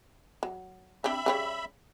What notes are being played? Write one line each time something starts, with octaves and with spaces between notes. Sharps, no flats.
F#3
C4 D4 G4 E5 B5
C#3 G3 C#5